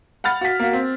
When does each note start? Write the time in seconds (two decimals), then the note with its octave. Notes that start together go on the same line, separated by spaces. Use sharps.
0.24 F#5 B5 F6 A6
0.41 F#4 B6
0.60 A#3 F#4
0.73 C4